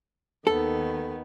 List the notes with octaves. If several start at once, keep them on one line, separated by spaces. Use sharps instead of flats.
D#2 D#3 B3 A4